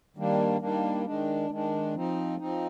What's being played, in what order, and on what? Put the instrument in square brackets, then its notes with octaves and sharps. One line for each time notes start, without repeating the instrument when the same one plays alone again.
[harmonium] D#3 G3 A#3 D4
D#3 G3 A#3 D4
D#3 G#3 D4
D#3 G#3 D4
F3 C4 D#4
F3 C4 D#4